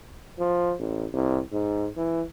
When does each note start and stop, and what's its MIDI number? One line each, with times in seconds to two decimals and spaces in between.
0.39 0.74 53
0.79 1.06 33
1.13 1.39 36
1.52 1.88 44
1.97 2.23 52